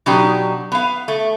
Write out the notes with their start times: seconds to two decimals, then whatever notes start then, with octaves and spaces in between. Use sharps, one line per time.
0.06 B2 F#3 D4 D#4 G4
0.72 B3 F5
1.08 A3